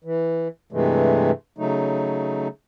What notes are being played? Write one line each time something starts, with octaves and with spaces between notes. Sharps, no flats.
E3
G2 C3 E3 G#3 A3
C#3 F#3 A3 D#4